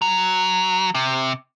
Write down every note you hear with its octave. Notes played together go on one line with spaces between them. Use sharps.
F#3
C3